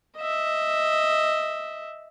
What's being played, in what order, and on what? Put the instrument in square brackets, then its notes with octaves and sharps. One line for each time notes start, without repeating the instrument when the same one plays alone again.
[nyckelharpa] D#5 E5